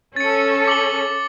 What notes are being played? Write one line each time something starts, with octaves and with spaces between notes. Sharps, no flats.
C#4 A4 A6 C#7
D6 F#7 G7